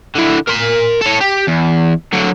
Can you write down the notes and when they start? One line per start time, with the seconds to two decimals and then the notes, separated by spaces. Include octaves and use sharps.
0.15 D3 E4
0.47 A#4 C6
1.02 A4 C#5
1.21 G4
1.48 E2
2.13 D3 F#3